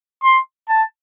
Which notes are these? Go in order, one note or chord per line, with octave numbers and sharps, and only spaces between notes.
C6
A5